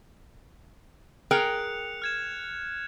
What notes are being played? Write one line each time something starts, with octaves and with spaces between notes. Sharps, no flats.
G#4 A#4 G5 F#6 C#7 F7
F6 G#6 E7